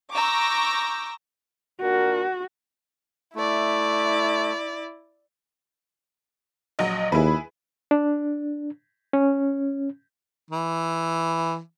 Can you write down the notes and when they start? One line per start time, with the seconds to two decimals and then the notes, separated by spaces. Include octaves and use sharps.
0.14 A#5 C#6 D6 E6 G6 A#6
1.82 A#2 D4 F#4 A#4
3.36 A3 E4 D5
6.79 A#1 F#3 D#5
7.12 D#2 E4 G#4 B4
7.91 D4
9.13 C#4
10.51 E3